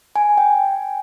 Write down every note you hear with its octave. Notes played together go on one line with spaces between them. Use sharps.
G#5
G5